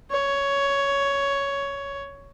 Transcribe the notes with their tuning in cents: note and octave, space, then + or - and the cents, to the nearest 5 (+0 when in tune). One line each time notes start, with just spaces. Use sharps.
C#5 +10